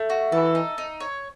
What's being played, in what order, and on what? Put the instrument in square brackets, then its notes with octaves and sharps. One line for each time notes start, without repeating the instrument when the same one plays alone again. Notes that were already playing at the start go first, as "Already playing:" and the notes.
Already playing: [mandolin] A3
F#4
[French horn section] E3 [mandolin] A4
[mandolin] D#4
D#4
C#5